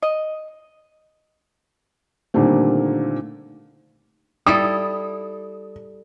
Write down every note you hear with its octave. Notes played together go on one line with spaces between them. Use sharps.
D#5
A#2 D3 D#3 G3 A3 C4
G3 E4 A4 D#6